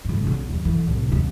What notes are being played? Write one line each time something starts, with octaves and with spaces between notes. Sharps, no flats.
F1 G#2
B1 D3
D#2
D3 E3
C2 A2
D#2 A#3